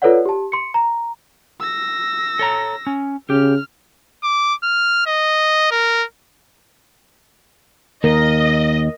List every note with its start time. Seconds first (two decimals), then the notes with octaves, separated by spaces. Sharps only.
0.02 F4 A4 B4 C#5 D5 F#5
0.25 G4 A5
0.52 C6 C#7
0.74 A#5
1.60 E6 A#6
2.39 A4 C#5 A#5
2.87 C#4
3.30 C#3 G4 F6
4.23 D6
4.63 F6
5.06 D#5
5.71 A#4
8.04 D#2 A#4 D#5